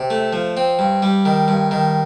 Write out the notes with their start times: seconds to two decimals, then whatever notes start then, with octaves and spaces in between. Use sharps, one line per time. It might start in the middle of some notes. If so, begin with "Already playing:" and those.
Already playing: C3
0.10 A3
0.33 F3
0.57 C4
0.79 G2
1.02 G3
1.25 D#3
1.48 G2
1.71 D#3